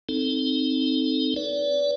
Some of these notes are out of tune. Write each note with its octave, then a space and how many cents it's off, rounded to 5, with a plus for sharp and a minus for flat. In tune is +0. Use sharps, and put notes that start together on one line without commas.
C4 +0 D#4 +0 A4 +0
B4 +0 D5 -30